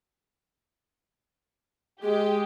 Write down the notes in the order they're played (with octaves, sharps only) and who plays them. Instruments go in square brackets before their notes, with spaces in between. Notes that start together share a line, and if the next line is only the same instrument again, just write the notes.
[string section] G#3 G4 [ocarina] G#4